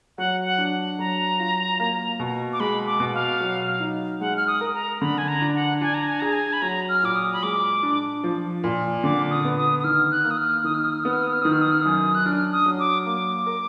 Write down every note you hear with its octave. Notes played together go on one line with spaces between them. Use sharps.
F#3 F#5
F#5
D4
F#3 A#5
F4
A#3
B2
D6
G#3 B5
D6
B2
F5
F#3
D#4
G#3 F#5
F6
D#6
A#4
A#5
D3 B5
G#5
A#5
D4
F#5
D4 G#5
A#5
G#5
G#4 A#5
G#5
B5
F#3 A#5
F6
A#2 D6
D#6
B5
G#3 D6
D4
F3
A#2
D3 D6
D#6
B3
D#6
D#6
D#3 F6
F#6
A#3
D#6
F6
D#3 D#6
F6
D#6
F6
B3 D#6
F6
D#6
F6
D#3 D#6
F6
D#6
F6
F#2 D#6
F#6
D4 F6
D#6
F#3
D6
A#3 D6
A#4